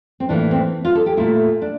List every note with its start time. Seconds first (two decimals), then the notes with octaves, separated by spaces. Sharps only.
0.20 C4
0.29 A2 E3 A#3 D4
0.51 C4
0.85 F4
0.95 A4
1.06 G4
1.17 A#2 A3 E4
1.62 D4